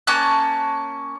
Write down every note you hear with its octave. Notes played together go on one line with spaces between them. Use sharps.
A#3 C#4 A5 F#6